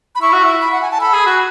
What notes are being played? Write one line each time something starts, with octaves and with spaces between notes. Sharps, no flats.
B5
E4 C#6
F#4
E4
B5
F#5
G#5
A5
A4 B5
G#4
F#4